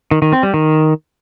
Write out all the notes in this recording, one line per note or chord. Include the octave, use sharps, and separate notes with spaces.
D#3
D#3
C4
G3
D#3